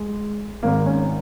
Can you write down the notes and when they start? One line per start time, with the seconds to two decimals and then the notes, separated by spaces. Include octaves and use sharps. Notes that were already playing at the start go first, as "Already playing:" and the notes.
Already playing: G#3
0.63 G#1 G#2 D#3 A#3
0.86 C#4